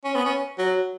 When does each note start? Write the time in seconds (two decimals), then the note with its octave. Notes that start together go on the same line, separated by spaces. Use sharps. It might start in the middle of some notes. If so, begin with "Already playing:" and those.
0.05 C#4
0.15 B3
0.25 C#4
0.58 F#3